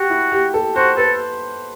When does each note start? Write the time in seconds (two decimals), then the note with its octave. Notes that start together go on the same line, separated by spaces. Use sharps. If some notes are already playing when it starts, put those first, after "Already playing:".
Already playing: F#4 G4
0.10 E4
0.32 G4
0.54 A4
0.76 F#4 C5
0.97 A4 B4